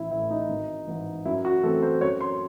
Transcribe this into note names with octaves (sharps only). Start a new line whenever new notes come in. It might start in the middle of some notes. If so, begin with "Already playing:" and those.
Already playing: A1 E4
A2 E3 A3 E4
D#4
G#1
G#2 E3
F#2 E4
F#4
E3 A3 C4 A4
C5
F#2 C#5
C6